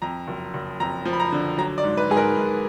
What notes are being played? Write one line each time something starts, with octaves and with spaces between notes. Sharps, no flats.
F2 A#5
F#1
F#1
F2 A#5
F3
B5
A#5
D3
F#3 A#5
D5
G#2
B4
G#2 G#4
A#4
G#2